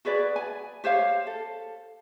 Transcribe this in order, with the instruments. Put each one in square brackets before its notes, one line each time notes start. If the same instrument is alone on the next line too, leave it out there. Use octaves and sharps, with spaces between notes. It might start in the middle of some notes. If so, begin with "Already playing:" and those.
[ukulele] F#4 G#4 B4 D5
G#5
G4 C5 C#5 F5
A4